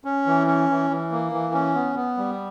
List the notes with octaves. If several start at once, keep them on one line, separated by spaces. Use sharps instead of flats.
C#4
E3
C#4
E3
E3
A#3
E3
C#4
B3
B3
G3